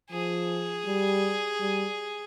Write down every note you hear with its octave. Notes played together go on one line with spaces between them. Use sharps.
F3 G#4
G3
G3